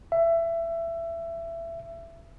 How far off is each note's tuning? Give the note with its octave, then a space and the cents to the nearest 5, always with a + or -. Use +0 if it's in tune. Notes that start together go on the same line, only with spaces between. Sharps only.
E5 +20